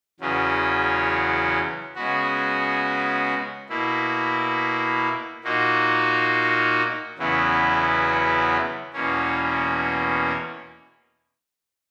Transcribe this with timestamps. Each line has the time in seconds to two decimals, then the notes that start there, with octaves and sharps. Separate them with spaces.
0.20 E2 C#3 F#3 C#4
1.95 C#3 G#3 B3 F#4
3.69 B2 A#3 E4
5.44 A#2 A#3 D#4 F#4
7.18 E2 C#3 F#3 B3 E4
8.93 E2 B2 A#3 C#4